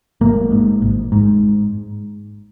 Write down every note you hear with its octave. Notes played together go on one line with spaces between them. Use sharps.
G#1 A#3
G#2
G#1
G#2